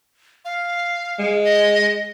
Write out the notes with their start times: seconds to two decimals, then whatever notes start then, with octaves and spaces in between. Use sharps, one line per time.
0.45 F5
1.19 G#3
1.44 D#5